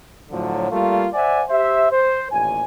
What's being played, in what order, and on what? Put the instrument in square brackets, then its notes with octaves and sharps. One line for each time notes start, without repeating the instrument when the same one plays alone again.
[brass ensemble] A2 D3 F3 F#3
G3 A3 A#3 F4
C5 D5 E5 F#5 G#5
G4 C5 E5
C5
A1 D#2 A#2 G#5